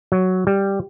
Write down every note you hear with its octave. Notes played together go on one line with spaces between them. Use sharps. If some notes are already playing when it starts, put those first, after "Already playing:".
F#3
G3